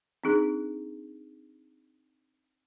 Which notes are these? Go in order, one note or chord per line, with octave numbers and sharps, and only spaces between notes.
C4 D4 D#4 G#4